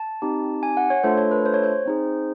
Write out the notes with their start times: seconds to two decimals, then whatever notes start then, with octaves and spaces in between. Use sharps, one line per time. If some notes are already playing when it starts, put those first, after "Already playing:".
Already playing: A5
0.22 C4 D#4 G4
0.63 G#5
0.77 F#5
0.90 C#5
1.04 A3 D4 F4 A4 C5
1.17 C#5
1.31 B4
1.45 C5
1.54 C#5
1.64 C5
1.86 C4 D#4 G#4